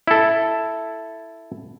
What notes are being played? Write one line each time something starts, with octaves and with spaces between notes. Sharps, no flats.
E4 A4